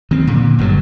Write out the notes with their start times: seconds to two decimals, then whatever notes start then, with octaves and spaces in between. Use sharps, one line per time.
0.11 D#3 C4
0.27 A#2 D3
0.59 G1 G2 A#2 F#3